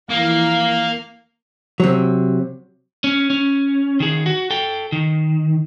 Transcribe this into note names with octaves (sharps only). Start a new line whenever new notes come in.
F2 E3 A#3 E4 F5
C3 F#3
C#4
C#4
D#3 G#4
F#4
A4 G5
D#3